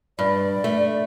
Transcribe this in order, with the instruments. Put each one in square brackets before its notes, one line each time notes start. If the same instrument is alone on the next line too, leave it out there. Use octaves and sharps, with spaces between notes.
[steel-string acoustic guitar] G2 [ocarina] D5
[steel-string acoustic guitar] A3